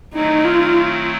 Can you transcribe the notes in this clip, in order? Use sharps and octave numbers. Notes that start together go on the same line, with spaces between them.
D#3 F#3 A3 C4 D#4 E4
F4